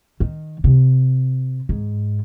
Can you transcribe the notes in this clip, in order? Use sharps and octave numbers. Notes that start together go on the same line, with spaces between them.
D#3
C3
G#2